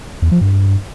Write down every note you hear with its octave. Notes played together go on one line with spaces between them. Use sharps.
E2
F3
G2